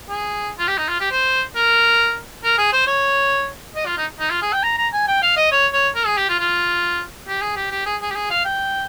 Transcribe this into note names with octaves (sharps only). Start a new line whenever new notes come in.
G#4
F4
G4
D#4
F4
G4
C5
A#4
A#4
G#4
C5
C#5
D#5
F4
D#4
D#4
F4
G#4
G5
A#5
A#5
G#5
G5
F5
D#5
C#5
C#5
A#4
G#4
G4
F4
F4
G4
G#4
G4
G4
G#4
G#4
G4
G#4
F5
G5